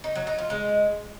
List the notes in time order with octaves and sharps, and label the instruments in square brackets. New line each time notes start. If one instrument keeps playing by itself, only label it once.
[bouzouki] D#4
F#3
D#4
F4
G#3